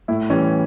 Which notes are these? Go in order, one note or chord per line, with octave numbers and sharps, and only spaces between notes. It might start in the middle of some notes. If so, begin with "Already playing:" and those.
A2 E4
E3 G3 C#4